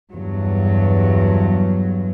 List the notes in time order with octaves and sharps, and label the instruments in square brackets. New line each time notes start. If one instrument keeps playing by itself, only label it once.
[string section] E2 G2 F#3